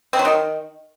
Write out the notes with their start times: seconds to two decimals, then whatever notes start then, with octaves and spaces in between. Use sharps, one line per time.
0.13 C4
0.19 F#3
0.25 D#3